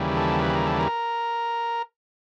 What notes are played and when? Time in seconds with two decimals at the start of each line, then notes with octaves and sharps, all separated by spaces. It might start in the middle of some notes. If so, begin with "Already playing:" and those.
Already playing: D#2 C#3 E3 G3
0.17 A4
0.42 B4
0.55 A#4
0.67 A4
0.78 A#4